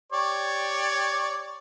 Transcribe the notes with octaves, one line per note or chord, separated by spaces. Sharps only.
G4 C#5 D5